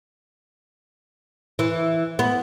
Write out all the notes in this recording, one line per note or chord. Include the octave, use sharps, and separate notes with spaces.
E3
B3